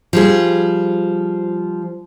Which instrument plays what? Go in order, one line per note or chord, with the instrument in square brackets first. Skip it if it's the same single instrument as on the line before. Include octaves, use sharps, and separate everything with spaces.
[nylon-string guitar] F3 G3 G#4